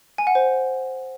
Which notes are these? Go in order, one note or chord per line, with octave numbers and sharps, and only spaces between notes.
G#5
F#5
C5